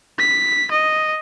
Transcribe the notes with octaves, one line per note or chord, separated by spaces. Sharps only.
B6
D#5